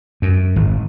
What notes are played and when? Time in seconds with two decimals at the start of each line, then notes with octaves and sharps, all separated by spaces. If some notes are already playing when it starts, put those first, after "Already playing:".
0.22 F#2
0.56 G#1